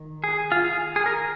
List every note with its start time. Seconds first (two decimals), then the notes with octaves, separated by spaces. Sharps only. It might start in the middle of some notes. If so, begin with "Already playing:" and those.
Already playing: D#3
0.24 G#4
0.52 F4
0.64 G#4
0.96 G#4
1.06 A#4